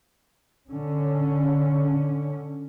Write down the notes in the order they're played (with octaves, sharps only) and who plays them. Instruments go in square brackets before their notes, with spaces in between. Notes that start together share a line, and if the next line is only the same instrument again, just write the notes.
[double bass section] D3 C#4